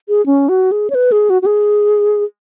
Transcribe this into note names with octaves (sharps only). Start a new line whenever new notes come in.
G#4
C#4
F#4
G#4
C#5
B4
G#4
F#4
F#4
G#4